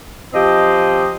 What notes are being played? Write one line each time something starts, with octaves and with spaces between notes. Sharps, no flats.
F3 C4 G4 D#5